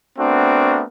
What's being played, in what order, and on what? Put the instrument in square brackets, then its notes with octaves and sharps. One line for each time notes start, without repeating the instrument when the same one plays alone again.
[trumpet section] A3 B3 C4 D4 F#4 A#4